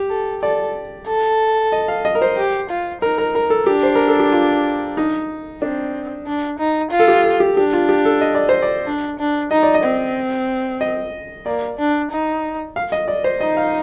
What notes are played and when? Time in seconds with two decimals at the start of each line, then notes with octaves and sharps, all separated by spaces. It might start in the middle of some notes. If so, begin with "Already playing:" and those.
Already playing: G4
0.10 A4
0.42 A4 D5
1.07 A4
1.72 D#5
1.88 F5
2.05 D#5
2.15 A#4
2.22 C5
2.37 G4
2.70 F4
3.02 D#4 A#4
3.18 A#4
3.35 A#4
3.50 A4
3.66 D4 G4
3.83 C5
3.95 A#4
4.08 A4
4.20 G4
4.32 F4
4.97 D#4
5.62 C4 D4
6.27 D4
6.59 D#4
6.91 F4
7.00 A4
7.08 G4
7.24 A4
7.40 G4
7.56 D4 G4
7.73 F4
7.89 G4
8.05 A4
8.21 D#5
8.35 D5
8.49 C5
8.63 D5
8.86 D4
9.19 D4
9.51 D#4 D#5
9.63 D5
9.74 D#5
9.84 C4
10.81 D#5
11.46 A#3 D5
11.78 D4
12.11 D#4
12.76 F5
12.92 D#5
13.08 D5
13.24 C5
13.41 D#4 D#5
13.57 F5